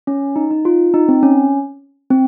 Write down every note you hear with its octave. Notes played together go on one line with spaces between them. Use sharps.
C#4
D#4
D#4
F4
D#4
C4
C#4
C4